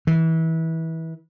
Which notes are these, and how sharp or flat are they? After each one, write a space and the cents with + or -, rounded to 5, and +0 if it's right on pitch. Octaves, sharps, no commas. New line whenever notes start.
E3 -25